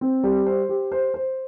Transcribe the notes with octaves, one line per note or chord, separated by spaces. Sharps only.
C4
G3
C5
G4
C5
C5